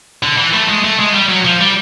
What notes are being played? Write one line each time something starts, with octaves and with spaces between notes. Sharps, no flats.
D3
E3
A3
G#3
A3
G#3
G3
F#3
F3
G3